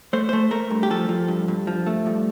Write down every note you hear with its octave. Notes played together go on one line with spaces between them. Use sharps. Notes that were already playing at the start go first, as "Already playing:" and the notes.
A3 C5
A3 C5
A3 A#4
G2
G4
F3 A4
F3
G2
G2
F3
A3
G2